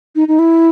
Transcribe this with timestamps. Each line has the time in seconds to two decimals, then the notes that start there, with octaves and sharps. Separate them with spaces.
0.16 D#4
0.28 D#4
0.39 E4